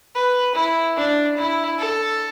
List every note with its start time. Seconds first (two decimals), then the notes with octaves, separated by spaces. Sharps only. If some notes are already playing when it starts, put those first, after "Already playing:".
0.15 B4
0.55 E4
0.97 D4
1.37 E4
1.79 A4